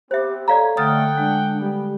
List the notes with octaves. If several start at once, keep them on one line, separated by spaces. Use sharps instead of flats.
B3 C4 G4 C5 E5
A4 C#5 D5 F5 A#5
D3 A3 F#5 G5 D#6 F6 A6
G#3 D4
G3 A#3 B3 G5